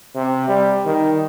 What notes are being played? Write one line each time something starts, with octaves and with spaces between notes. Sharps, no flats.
C3
G3
D#3